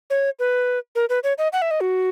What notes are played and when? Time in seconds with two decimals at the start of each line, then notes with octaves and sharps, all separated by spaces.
0.10 C#5
0.39 B4
0.95 A#4
1.09 B4
1.24 C#5
1.38 D#5
1.53 F#5
1.62 E5
1.71 D#5
1.81 F#4